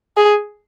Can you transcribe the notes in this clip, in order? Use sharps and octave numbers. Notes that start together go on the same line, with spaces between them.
G#4